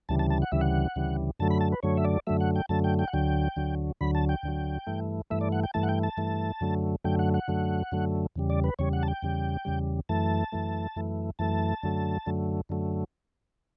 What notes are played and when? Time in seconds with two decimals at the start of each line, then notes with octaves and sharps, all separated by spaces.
0.09 D2 C#3 E3 G3 A5
0.19 A5
0.30 A5
0.42 F#5
0.52 D2 C#3 E3 G3 E5
0.61 F#5
0.96 D2 C#3 E3 G3
1.40 F#2 D3 F#3 A3 A5
1.50 B5
1.61 A5
1.72 B4
1.83 F#2 D3 F#3 A3 C#5
1.97 E5
2.05 D5
2.27 F#2 D3 F#3 A3 E5
2.41 F#5
2.56 G5
2.69 F#2 D3 F#3 A3 A5
2.84 G5
2.99 G5
3.08 F#5
3.13 D2 D3 F#3 G5
3.57 D2 D3 F#3
4.01 D2 D3 F#3 B5
4.15 A5
4.29 G5
4.43 D2 D3 F#3
4.87 G2 E3 A3
5.30 G2 E3 A3 E5
5.41 D5
5.52 F#5
5.63 G5
5.74 G2 E3 A3 A5
5.83 F#5
5.89 G5
6.03 A5
6.17 G2 E3 A3
6.61 F#2 D3 F#3 A3
7.05 F#2 D3 F#3 A3 G5
7.19 F#5
7.34 F#5
7.48 F#2 D3 F#3 A3
7.92 F#2 D3 F#3 A3
8.36 E2 C#3 G3
8.50 D5
8.64 B4
8.79 E2 C#3 G3 C#5
8.93 F#5
9.03 A5
9.08 G5
9.23 E2 C#3 G3
9.65 E2 C#3 G3
10.09 F#2 E3 A3 A5
10.52 F#2 E3 A3
10.96 F#2 E3 A3
11.39 F#2 E3 A3 A5
11.83 F#2 D3 F#3 A3
12.26 F#2 D3 F#3 A3
12.69 F#2 D3 F#3 A3